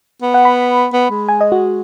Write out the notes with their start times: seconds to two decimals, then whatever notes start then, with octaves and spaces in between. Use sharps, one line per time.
0.22 B3
0.34 F#5
0.45 B5
0.93 B3
1.10 G#3
1.29 G#5
1.41 D#5
1.52 F#4